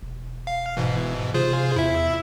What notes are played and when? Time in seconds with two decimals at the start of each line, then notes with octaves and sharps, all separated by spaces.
0.03 E1
0.47 F5
0.77 G#2 B2 E3
1.34 C3 F4 G#4 C5
1.76 E2 E4 E5